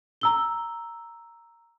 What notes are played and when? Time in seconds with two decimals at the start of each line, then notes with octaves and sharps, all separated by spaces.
0.21 A#5 E6 G7